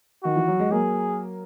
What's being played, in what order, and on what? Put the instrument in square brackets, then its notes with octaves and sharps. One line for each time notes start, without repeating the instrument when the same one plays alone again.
[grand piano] D#3 [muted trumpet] F#4
[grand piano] E3
F#3
G#3
[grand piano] F#3 A#3 [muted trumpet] G#4